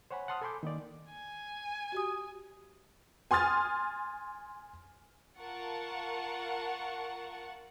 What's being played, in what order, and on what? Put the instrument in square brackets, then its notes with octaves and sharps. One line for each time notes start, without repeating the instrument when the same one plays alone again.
[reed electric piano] C5 C#5 F#5 G#5 B5
F#5 A5 C6 D#6 F6
A4 G#5 B5 C6 D6 G6
D#3 A#3 D#4 D5
[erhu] G#5
[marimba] F#4 G4 D#6
[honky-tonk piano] G#5 C6 D#6 F6 A6
[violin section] F4 A#4 F#5 A5 C#6